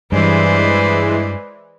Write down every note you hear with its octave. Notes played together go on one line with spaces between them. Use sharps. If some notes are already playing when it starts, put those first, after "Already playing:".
G2 E3 G#3 B4 C5 D5